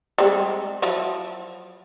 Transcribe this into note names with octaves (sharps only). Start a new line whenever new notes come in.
G3 G#3 C4
F3 F#3 E4